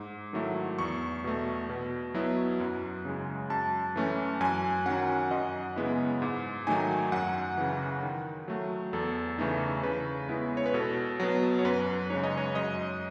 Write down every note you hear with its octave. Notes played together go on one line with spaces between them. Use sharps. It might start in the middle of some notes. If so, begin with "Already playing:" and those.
Already playing: G#2
D#3 F#3 A3 E4
E2 C#6
B2 A3
B2
F#3 B3 E4
F#2
C#3 G#3
F#2 A5
E3 A3 C#4
F#2 G#5
D#3 F#3 C#4 F#5
F#2 D#5
C#3 G#3 B3 E4
G#2
D#3 F#3 A3 D#4 G#5
F#2 F#5
C#3 E3
D#3
F#3 A3
E2 A4
C#3 E3 A3 D#4
C#3 B4
G#3 B3 E4
C#5
B4
B2 A4
F#3 B3
C#5
F#2 B4
C#3 G#3 D#4 C#5
D#5
C#5
F#2 D#5